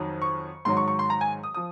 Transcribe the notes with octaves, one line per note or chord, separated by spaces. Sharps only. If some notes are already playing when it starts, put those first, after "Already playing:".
Already playing: F2 D#3 F#3
C#6
G#2 D#3 F#3 C6
C#6
C#6
C6
A#5
G#5
D#6
F3 D#6